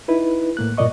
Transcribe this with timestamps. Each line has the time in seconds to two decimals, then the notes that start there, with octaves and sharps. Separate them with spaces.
0.08 D#4 E4 B4
0.57 A2 A#3 F#6
0.77 G2 A#2 A#3 D5 D#5 C#6